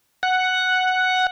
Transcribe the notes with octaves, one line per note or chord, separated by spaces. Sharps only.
F#5